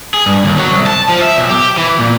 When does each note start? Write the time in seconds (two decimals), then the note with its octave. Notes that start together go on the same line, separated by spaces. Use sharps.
0.14 G#4
0.26 G2
0.45 D#2
0.58 F#3
0.70 C2
0.86 A5
1.09 F3
1.21 E5
1.36 B1
1.50 G4
1.77 E3
1.99 A#2